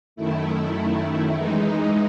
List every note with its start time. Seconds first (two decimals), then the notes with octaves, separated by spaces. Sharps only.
0.16 F#2 D#3 A3 E4
1.34 E3 G#3 D#4